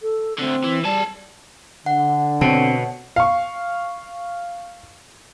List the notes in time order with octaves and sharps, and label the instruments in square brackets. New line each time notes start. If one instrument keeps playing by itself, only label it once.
[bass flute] A4
[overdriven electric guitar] D2 D3 [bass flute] C4
[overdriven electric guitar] E3
[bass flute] G3 [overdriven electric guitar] G#4 A5
[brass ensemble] D3 [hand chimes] F#5
[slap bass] B2 [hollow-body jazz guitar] C4 [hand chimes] C#5 F#5 A5
[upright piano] F5 C#6